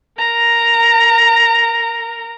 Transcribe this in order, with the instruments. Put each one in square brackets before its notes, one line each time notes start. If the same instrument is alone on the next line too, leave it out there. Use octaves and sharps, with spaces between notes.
[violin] A#4 A#5